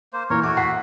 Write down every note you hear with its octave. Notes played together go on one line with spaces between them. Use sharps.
A#3 C5
A#2 E3 A#4 C#5
A3 F#4 D6
F#5 B6 C7